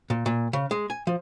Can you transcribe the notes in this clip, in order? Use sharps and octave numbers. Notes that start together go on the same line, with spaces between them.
A#2
A#2
C#3
G#3
G#5
F3